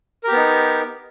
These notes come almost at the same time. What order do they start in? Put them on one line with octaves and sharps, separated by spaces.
A#4 G4 B3 D#4